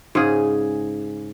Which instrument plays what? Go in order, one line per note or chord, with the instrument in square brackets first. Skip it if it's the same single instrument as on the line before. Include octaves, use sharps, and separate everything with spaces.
[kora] G#2 C#3 G#4